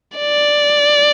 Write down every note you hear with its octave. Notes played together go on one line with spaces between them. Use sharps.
D5